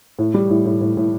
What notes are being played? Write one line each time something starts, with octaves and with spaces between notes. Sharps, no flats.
A2
G3
A2
A2
A2
A2